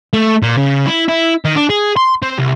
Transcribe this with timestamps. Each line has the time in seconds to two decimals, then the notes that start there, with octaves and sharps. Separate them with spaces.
0.13 A3
0.43 A#2
0.58 C#3
0.86 E4
1.08 E4
1.45 D#3
1.56 D4
1.70 G#4
1.97 C6
2.22 C4
2.38 C2